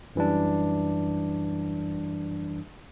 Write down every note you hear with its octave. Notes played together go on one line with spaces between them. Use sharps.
F#2 E3 G3 D4